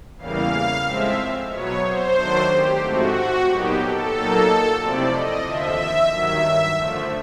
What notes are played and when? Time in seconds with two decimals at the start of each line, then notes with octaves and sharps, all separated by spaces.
0.18 E2 C#3 E3 G3 A#3 F5
0.84 A2 F3 G#3 C4 E5
1.50 B2 F#3 B3 C#5
1.83 C5
2.16 D#3 F#3 A3 D4
2.49 G4
2.82 G#2 F3 A3 C4 F#4
3.47 A#2 F#3 B3 D#4 G4
3.80 A4
4.13 A#2 F#3 A#3 D#4
4.80 C3 F3 A3 C4 E4 D5
5.12 D#5
5.45 D#2 D3 F3 E5
6.11 G2 D#3 F#3 E5
6.77 D3 F3 A3